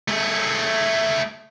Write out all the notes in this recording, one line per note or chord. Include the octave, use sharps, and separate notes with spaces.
A3 G#4